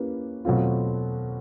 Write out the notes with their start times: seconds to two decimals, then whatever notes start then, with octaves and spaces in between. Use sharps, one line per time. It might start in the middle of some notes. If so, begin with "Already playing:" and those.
Already playing: A#3 C#4 E4 G4 B4
0.45 B2 F#3 A3 C4 F4